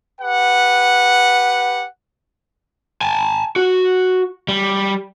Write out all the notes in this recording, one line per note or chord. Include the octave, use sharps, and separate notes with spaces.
G4 B4 F#5
G#5 A5
F#4
G3